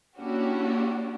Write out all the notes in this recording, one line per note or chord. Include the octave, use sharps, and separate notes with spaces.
A#3 C#4 D4 E4 F#4 G4